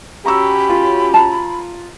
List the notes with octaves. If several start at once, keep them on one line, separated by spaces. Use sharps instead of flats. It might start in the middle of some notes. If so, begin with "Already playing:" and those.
C#4 F#4 G4 A#5 B5 C#6 E6
F4
A5 A#5